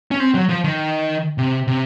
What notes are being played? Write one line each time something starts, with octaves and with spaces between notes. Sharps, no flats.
C#4
C4
F#3
F3
D#3
C3
C3